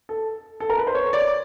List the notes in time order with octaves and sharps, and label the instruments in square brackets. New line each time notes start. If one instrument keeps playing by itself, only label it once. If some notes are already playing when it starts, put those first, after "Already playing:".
[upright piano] A4
A4
A#4
B4
C5
C#5
D5